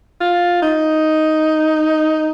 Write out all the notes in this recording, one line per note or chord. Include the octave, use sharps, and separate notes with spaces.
F4
D#4